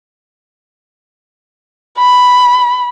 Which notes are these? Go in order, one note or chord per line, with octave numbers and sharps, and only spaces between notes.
B5